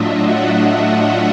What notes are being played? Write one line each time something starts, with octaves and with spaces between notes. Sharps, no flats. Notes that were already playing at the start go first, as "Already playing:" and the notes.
Already playing: A2 F#3 A3 D4 F4 D#5 E5
F#5